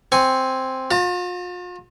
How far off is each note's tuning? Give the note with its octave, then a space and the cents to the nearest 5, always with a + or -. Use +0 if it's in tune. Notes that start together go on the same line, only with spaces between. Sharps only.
C4 +0 G#5 +0 C#6 +0
F4 +40 A#5 -25